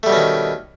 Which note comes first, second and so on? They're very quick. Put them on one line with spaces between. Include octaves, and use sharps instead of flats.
A3 G3 B2 C#4 D#3